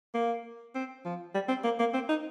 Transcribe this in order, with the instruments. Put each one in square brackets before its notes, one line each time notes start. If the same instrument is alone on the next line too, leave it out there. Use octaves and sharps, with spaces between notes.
[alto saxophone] A#3
C4
F3
G3
C4
A#3
A#3
C4
D#4